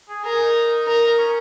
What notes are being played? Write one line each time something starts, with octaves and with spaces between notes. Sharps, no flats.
G#4
G#4 A#4
D#4
A#4
C#4